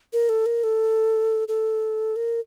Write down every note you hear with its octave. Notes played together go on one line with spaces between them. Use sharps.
A#4
A4
A#4
A4
A4
A#4